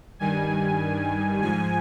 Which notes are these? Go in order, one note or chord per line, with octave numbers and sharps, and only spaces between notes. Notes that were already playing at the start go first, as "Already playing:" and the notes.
G2 D#3 G3 G#5
G#2 F3 G#5